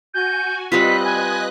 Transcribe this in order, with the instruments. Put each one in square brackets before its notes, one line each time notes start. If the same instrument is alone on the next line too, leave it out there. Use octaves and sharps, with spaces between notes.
[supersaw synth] F#4 G#5 [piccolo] G6
[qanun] G3 C4 F4 [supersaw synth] B4 D#5 F#6 [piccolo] B6
[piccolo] G#5